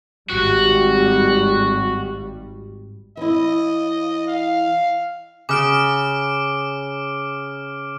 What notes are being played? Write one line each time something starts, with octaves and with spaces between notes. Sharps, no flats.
G#1 G3 F#4
E3 E4 D#5
F5
C#3 D6 F6 D7